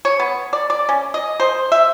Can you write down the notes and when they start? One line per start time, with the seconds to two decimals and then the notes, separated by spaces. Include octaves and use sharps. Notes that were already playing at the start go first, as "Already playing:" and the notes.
0.05 C#5
0.20 B3
0.53 D5
0.70 D5
0.89 C#4
1.14 D#5
1.40 C5
1.72 E5